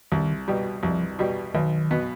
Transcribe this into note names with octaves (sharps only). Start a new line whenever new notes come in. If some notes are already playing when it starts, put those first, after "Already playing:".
C2 D#3
B2 G3
C2 F3
B2 G3
B1 D#3
B2 B3